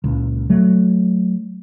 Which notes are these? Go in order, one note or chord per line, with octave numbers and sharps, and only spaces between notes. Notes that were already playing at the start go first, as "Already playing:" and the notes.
C#2 A#2
F#3 A3